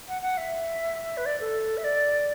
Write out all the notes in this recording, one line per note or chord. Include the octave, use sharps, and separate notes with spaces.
F#5
F#5
E5
B4
D5
A4
E5
D5